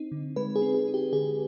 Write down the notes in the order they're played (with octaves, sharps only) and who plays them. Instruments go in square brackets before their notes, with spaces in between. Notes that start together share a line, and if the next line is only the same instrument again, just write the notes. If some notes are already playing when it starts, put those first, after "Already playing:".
Already playing: [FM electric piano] C4 D#4
D3
G#3 B4
G#4
C4
G#4
D#4
G4
D3 G#4